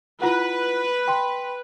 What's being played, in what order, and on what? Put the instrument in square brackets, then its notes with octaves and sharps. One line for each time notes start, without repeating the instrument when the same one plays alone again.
[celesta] E4 F4 F#5 [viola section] B4
[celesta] G5 B5 C6